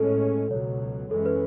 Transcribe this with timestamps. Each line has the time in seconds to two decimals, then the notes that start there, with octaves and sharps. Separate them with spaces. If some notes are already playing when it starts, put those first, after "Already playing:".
Already playing: A2 G#3 C#4 A4
0.51 C#2 B2 F#3 C#5
1.11 F#2 E3 G#3 C#4 A4
1.26 B4